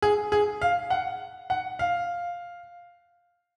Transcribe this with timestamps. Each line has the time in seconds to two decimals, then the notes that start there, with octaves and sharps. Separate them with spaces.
0.02 G#4
0.32 G#4
0.62 F5
0.90 F#5
1.50 F#5
1.79 F5